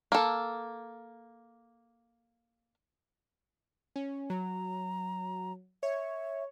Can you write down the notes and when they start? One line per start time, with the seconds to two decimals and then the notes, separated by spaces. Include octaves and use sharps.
0.12 A#3 A4
3.96 C#4
4.30 F#3 A#5
5.83 C#5 E5